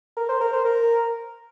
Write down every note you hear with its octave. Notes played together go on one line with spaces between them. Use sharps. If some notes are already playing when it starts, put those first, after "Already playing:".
A#4
C5
A#4
C5
A#4